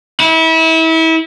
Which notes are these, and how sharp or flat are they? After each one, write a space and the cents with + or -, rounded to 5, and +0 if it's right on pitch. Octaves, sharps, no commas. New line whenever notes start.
E4 -30